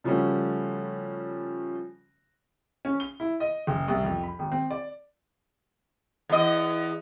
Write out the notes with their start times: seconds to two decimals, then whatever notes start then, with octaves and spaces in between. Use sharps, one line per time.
0.04 C#3 F3 G3 A3 C#4 F#4
2.85 C#4
3.00 G7
3.20 E4
3.40 D#5
3.67 F#1
3.88 C2
4.03 F2
4.23 B5
4.39 G#1
4.52 C4
4.71 D5
6.29 E2 D#5